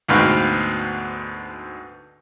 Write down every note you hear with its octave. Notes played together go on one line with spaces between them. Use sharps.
D2 G#2 B2 B3 C4 F5